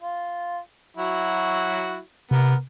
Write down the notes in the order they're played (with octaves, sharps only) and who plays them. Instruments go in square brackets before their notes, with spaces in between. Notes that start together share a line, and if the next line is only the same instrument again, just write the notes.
[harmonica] F4
F#3 E4 F#4
[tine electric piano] C3 [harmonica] B3 A#4